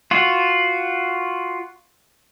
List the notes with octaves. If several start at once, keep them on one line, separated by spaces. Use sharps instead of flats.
F4 F#4